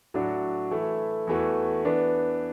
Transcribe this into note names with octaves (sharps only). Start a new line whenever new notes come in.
A2 F#3 D4 F#4
E3 A3 E4
E2 E3 A3 F#4
E3 B3 D4